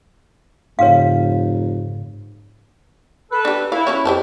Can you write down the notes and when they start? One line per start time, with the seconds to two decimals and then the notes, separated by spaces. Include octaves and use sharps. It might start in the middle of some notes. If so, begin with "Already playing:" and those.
0.79 F1 G#2 C#3 C#5 F5
3.31 A4 B4
3.45 D4 G4
3.72 E4 F5
3.87 F#3 C#4 C#5
4.05 F2 G4 C5 A5